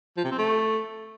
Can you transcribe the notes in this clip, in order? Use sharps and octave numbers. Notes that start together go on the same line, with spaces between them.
F3
C3
C4
A3